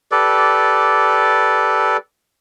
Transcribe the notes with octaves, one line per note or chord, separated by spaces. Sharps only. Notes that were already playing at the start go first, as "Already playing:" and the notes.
G4 A4 B4 D5